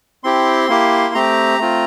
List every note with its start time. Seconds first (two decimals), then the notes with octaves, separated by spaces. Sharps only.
0.24 C4 E4 G4 C6
0.69 A#3 E4 G4
1.14 A3 C4 G4 A#5
1.59 A3 C4 F4